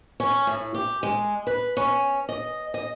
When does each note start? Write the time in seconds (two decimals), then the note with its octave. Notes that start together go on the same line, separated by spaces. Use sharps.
0.20 C#4
0.47 A2
0.74 G4
1.03 G#3
1.47 B4
1.77 C#4
2.29 D#5
2.74 D#5